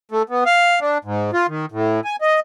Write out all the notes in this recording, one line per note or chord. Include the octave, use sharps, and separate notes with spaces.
A3
B3
F5
D4
G#2
F4
D#3
A2
G#5
D#5